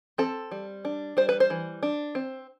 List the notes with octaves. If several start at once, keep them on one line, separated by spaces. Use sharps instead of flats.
C4 A4
G3
D4
G3 C5
B4
C5
E3
D4
C4